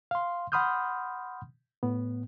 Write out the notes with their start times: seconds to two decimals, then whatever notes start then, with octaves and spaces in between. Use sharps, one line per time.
0.11 F5 C6
0.52 F#5 B5 C6 D#6 F6 G6
1.83 A2 B3